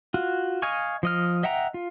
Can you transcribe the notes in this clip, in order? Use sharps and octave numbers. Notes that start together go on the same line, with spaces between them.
F4 F#4
D#5 F5 G#5 C#6
F3 D#5 F6
D#5 E5 F#5 G5 A#5
F4